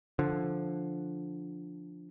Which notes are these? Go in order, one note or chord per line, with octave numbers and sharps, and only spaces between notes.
D3 F3